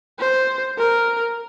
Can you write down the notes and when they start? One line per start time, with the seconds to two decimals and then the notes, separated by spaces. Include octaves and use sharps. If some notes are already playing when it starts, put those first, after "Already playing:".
0.19 C5
0.78 A#4